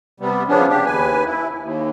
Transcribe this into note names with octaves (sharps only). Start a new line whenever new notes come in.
C3 G3 B3
C#3 F3 B3 C#4 D4
D4 G4
D#2 B4 G#5
E4
D#2